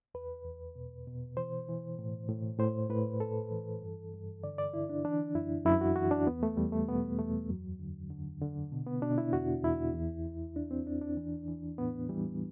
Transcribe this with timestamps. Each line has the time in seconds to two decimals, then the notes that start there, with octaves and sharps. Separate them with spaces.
0.14 E2 B4
0.45 E2
0.76 B2
1.07 B2
1.37 E3 C5
1.68 E3
1.99 A2
2.29 A2
2.59 A2 C5
2.90 A2 B4
3.20 A2 A4
3.51 E3
3.82 G2
4.13 G2
4.44 D3 D5
4.58 D5
4.74 D3 E4
4.89 D4
5.04 E3 D4
5.35 F#2 E4
5.66 F#2 E4
5.81 F#4
5.96 E3 F#4
6.11 D4
6.27 E2 B3
6.43 A3
6.57 E2 G3
6.72 A3
6.88 B2 B3
7.19 E2 A3
7.49 F#2 F#3
7.79 D3
8.10 D3
8.42 D3
8.72 B2
8.87 B3
9.02 B2 D4
9.18 E4
9.33 E2 F#4
9.64 E2 E4
9.94 E2
10.25 E2
10.56 E3 D4
10.71 C4
10.86 E2 D4
11.01 D4
11.17 E3
11.48 E3
11.78 A2 B3
12.09 E3 G3